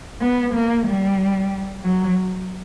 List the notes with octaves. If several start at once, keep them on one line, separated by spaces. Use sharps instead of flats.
B3
A#3
G3
F#3